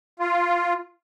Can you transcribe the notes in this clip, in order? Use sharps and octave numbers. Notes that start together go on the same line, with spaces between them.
F4